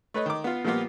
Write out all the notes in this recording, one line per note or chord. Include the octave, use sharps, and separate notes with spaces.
A3 B4 C#5 D#5
D#3 D6
B3 F4
A#2 F3 G3 A#3 B3 F4